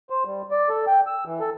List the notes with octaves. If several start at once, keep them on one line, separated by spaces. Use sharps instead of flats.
C5
G3
D5
A4
G5
E6
E3
A4